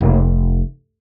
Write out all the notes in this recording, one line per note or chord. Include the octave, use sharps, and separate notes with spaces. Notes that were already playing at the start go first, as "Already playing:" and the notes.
F1